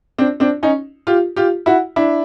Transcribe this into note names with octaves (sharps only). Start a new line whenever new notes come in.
C4 D4
C4 D4
C#4 D#4
F4 G4
F4 G4
E4 F#4
D4 E4